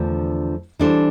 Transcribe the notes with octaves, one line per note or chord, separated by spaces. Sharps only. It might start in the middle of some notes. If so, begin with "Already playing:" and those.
Already playing: E2 D3 F3 A3 D4
E3 G3 D4 A4 C5